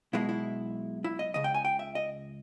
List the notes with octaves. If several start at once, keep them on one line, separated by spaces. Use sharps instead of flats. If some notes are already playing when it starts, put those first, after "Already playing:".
B1 B2 G#3 E4
E4
E4
D#5
C#2 C#3 D#5
G5
G#5
G5
E5
D#5